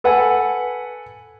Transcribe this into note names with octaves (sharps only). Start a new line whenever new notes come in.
A4 B4 F#5 G#5